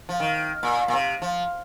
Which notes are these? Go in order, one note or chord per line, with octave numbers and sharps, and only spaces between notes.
F3
D#3
A#2
A#2
C3
F3